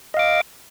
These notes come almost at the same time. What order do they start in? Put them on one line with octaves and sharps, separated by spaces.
D#5 F5 D6